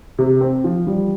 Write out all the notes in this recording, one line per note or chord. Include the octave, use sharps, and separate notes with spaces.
C3
C4
F3
G3